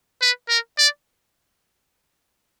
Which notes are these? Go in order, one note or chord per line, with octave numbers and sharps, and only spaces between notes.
B4
A#4
D5